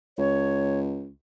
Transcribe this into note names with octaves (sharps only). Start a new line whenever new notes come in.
C#2 C#5